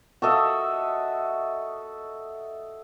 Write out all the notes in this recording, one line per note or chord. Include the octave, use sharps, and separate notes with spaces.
F#4 A4 D#5 E5